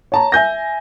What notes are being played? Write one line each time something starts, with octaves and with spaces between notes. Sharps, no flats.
C#5 A5 A#5
E5 G#5 G6 A#6